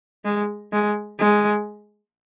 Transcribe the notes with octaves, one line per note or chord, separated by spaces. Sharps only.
G#3
G#3
G#3